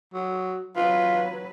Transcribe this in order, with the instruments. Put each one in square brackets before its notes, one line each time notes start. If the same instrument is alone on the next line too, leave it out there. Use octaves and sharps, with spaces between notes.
[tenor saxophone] F#3
[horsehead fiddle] F#3 B4 [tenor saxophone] F4